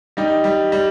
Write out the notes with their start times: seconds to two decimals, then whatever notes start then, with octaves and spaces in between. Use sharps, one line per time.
0.17 G3 D#4 G4
0.44 G3
0.72 G3